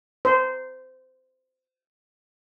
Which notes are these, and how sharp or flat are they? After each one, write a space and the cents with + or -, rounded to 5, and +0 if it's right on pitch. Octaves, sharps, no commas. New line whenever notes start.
C5 -20